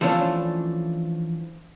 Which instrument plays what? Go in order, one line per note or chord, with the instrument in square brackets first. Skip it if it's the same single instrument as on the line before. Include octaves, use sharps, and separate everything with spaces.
[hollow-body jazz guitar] E3 F3 A3 C#4 D4